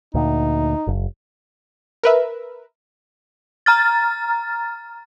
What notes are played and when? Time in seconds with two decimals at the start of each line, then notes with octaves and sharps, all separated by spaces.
0.14 D2 A#2 D#4
0.87 F#1
2.03 A#4 B4 E5
3.66 A#5 F6 A6